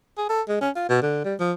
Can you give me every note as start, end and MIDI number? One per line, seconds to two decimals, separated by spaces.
0.18 0.27 68
0.29 0.41 69
0.48 0.57 56
0.61 0.70 61
0.75 0.85 65
0.89 1.02 47
1.02 1.21 50
1.25 1.35 55
1.40 1.53 53